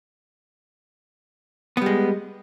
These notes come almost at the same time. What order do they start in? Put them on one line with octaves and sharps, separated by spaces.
B3 G3 G#3